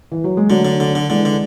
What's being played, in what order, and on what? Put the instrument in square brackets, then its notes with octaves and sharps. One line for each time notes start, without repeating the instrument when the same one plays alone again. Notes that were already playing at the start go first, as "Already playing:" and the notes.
[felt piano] E3
F#3
G#3
[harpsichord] D3 [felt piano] F#3 A3
[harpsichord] D3
D3
D3
[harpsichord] D3 [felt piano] E3 G#3
[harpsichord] D3